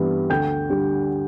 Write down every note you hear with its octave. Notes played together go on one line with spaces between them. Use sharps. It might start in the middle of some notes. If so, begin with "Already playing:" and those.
Already playing: G2 E3 G3 B3
D2 G5 G6
D3 G3